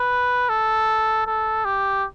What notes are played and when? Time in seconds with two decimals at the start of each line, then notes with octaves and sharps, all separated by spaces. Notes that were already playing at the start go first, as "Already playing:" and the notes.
Already playing: B4
0.49 A4
1.27 A4
1.65 G4